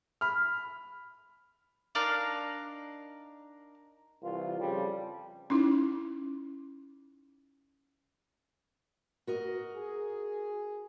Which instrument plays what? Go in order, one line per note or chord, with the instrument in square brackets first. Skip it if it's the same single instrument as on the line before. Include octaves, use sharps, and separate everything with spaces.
[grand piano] B5 F6
[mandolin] D4 D#4 A#4 F5
[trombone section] C2 E3 F4
F2 C#3 F3 G3
[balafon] C#4 D#4 E4
[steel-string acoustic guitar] F#4 A#4 D#5
[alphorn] G#4